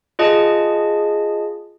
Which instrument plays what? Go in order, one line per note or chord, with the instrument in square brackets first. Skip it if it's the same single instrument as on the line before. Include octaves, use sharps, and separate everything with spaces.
[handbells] F4 G#4 D#5 A5